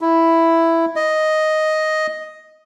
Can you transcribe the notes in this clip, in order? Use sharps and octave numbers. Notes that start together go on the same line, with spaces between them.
E4
D#5